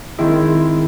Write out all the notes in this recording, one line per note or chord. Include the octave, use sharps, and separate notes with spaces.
D#3 G#3 C4 E4